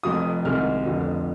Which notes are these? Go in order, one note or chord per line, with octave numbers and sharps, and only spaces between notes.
F1 F2 C3 F3 D#6
C2 C3 D#3 G#3 F6
F1 F2 D3 F3